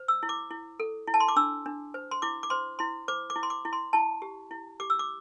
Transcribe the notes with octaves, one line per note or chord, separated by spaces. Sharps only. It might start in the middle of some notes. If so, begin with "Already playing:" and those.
Already playing: C5
E6
E4
D6
E4
A4
E4
A5
C6
D6
D4 E6
D4
C5
C6
E4 D6
D6
C5 C6
E4 C6
C5 D6
D6
E4
C6
D6
E4
C6
E4 A5
G4
E4
G4 D6
E6
D6